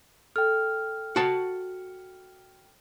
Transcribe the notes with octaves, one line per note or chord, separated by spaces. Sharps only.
A4 G5 F6
F#4 A5